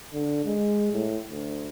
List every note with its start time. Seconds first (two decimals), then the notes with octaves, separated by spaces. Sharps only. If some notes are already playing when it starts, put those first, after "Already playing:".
0.14 D3
0.45 G#3
0.93 A2
1.31 D2